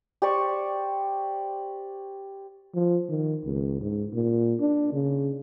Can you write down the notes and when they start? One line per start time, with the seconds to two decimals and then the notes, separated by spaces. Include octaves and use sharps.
0.22 G4 C5 D5 C#6
2.74 F3
3.09 D#3
3.45 C#2
3.81 G#2
4.13 A#2
4.60 D4
4.93 C#3